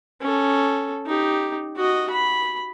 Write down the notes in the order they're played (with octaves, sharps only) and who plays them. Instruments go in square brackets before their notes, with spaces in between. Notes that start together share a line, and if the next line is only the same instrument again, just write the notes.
[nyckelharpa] C#4 A4
D#4 G4
F#4 D#5
B5